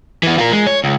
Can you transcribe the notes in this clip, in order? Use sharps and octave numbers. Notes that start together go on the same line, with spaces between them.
E3 B3
F4 A#4
G#3
C#5
C#2